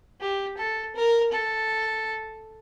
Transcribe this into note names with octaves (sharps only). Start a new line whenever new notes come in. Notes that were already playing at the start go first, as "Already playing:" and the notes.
G4
A4
A#4
A4